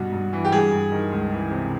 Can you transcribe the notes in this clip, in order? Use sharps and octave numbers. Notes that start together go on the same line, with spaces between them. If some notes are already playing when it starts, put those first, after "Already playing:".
Already playing: G2 B2 F#4
G2
E3
G4
G2 G#4
G2
D#3
C#2
E3
C3